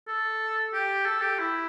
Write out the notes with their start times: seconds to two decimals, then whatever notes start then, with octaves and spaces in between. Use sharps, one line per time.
0.07 A4
0.73 G4
1.06 A4
1.22 G4
1.38 E4